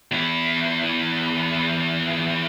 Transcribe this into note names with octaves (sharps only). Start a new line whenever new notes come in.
E2 E4